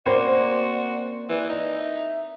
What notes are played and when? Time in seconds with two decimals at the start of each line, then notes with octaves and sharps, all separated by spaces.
0.06 A#3 C4 C#4 F#4 C5 D5
1.29 E3 D5
1.49 D#4 D5
1.76 E5